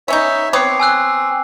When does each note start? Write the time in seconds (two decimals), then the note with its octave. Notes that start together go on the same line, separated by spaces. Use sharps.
0.08 B3 C#4 D#4 C#5 E5
0.53 B3 C4 B4 C#5 D6 D#6 C7
0.80 G#5 E6 F#6